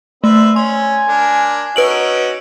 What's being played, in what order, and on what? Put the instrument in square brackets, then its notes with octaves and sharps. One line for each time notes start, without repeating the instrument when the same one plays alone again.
[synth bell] A3 [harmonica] C4 B4 E5
[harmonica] C#4 [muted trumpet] G#5 [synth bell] C6
[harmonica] D4 A#4
[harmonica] C#4 D#4 F#4 [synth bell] B4 D7 F#7